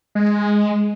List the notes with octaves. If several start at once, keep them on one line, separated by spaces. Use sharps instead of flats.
G#3